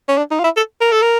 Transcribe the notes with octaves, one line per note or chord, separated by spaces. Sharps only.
C#4
D4
D#4
F4
E4
A4
A#4
A4
A#4